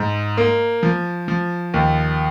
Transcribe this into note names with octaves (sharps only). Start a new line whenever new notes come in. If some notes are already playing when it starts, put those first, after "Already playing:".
Already playing: G#2
A#3
F3
F3
D#2